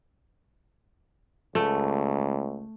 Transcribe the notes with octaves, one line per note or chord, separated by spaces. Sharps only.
C#2 A3